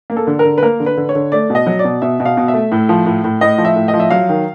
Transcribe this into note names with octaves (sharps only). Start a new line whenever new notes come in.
A#3
A4
D3
A#4
D3
B4
A#3 A#4
D3
B4
D3
C#5
D3
A3 D5
B2
D#5
F#3
D5
B2
B2 E5
B2
F5
B2
E5
A3
A2
F3
A2
A2
A2 D#5
F3
E5
A2
D#5
F3
E5
F#3 F5
D#3